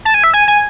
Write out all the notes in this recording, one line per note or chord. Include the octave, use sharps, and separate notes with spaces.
A5
G#5
E5
G#5
G#5